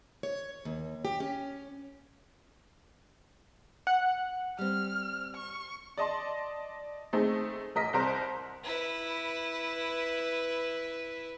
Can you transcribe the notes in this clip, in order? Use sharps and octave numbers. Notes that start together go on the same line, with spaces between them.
C#5
D#2
G4
C#4
F#5
G3 C4 F6
C#6
D5 D#5 A5 C6
A3 C4 D#4 G#4
A1 A#4 D#5 B6
C2 C4 A#4 C5
E4 B4